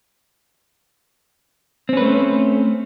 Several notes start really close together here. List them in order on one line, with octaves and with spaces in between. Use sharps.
C4 C#4 B4 A3 C5